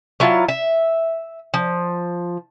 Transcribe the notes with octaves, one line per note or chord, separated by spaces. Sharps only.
F#3 E4 F4 A5
E5
F3